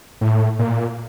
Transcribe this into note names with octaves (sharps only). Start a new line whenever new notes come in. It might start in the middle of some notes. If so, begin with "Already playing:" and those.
A2
A#2